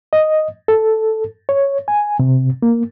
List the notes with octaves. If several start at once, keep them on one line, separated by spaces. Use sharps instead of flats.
D#5
A4
C#5
G#5
C3
A#3